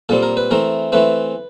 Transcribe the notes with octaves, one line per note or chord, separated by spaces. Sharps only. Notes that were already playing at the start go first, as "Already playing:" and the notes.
A#2 G3 C4 A4
A#4
B4
E3 A3 C4 A#4
E3 A3 C4 B4